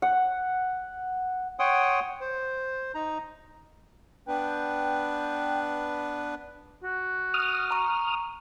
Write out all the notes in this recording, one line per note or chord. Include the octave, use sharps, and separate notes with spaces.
F#5
C#5 F#5 G5 C6 D#6
C5
D#4 A#5
B3 D4 B4 G5
F#4
D#6 F6
A#5 C#6